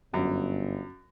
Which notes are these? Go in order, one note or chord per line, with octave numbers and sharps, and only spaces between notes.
G1 F#2